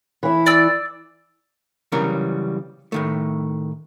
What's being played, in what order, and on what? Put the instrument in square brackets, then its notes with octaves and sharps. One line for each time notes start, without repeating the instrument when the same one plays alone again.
[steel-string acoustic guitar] E3 E4
[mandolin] D5 E6
[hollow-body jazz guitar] C#3 E3 F#3 G3 C#4 A#4
A2 D#3 A3